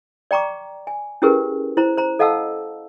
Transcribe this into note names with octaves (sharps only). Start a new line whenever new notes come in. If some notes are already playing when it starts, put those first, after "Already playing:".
D5 G5 A#5 C#6 D6
G#5
C#4 E4 G4 G#4 A#4 B4
E4 C5 A#5
C5 A#5
A4 D#5 F5 F#5 A5 E6